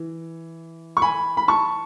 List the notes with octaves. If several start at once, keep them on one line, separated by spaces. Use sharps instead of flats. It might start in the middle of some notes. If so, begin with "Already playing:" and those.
Already playing: E3
C#6
G#5 B5
B5
A5 C#6